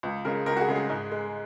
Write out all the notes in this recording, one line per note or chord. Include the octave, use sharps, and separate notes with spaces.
C#2
C#3 G#3 A#4
C#2 A#4
F#4
G#4
C#3 G#3
G#4
G#2
G#3